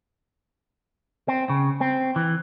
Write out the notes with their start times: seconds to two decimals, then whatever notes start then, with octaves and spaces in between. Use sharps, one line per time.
1.28 C4
1.50 C#3
1.81 C4
2.16 E3